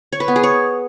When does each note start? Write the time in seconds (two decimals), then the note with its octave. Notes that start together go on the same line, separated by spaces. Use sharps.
0.13 C#5
0.20 B4
0.28 B3
0.36 G#4
0.43 C#5